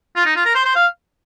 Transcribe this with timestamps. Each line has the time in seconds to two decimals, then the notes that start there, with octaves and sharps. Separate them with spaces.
0.15 F4
0.25 D#4
0.36 F4
0.45 A#4
0.55 C5
0.65 C5
0.75 F5